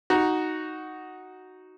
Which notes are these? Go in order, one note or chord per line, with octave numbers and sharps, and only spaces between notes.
D#4 F#4